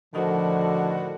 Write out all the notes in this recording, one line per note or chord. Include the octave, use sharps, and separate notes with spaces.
A2 D3 D#3 F3 F#4